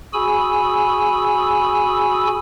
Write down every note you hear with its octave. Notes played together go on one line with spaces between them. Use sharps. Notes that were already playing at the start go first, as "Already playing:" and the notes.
F#4 G#4 G#5 B5 E6